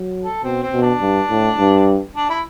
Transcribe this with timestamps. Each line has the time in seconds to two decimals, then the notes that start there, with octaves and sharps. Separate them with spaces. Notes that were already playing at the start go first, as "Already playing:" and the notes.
Already playing: F#3
0.24 A4
0.43 B2 C4
0.62 C4
0.73 B2
0.81 D4
1.01 G2
1.30 A2
1.58 G2
2.15 D4
2.29 E4